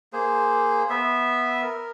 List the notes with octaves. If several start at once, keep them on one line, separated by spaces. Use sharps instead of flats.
A#3 G#4 C5
B3 E5
A#4